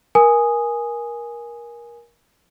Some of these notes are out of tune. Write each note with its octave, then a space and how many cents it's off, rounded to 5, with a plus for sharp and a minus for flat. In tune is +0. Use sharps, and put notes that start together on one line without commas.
A#4 +20 G#5 +0 D#6 -5